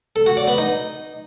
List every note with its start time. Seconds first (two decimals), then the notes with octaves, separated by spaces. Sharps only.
0.16 A4
0.26 F#4
0.37 D5
0.48 B3
0.58 D#4